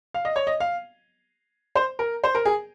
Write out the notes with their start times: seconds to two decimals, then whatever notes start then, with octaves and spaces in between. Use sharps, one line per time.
0.14 F5
0.25 D#5
0.36 C#5
0.47 D#5
0.60 F5
1.75 C5
1.99 A#4
2.24 C5
2.35 A#4
2.45 G#4